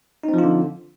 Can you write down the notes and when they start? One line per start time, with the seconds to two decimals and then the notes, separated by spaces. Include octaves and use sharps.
0.23 D#4
0.28 C4
0.33 F3
0.38 F4
0.43 D3